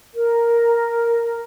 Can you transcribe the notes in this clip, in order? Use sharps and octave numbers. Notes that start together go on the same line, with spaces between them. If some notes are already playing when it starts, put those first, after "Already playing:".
A#4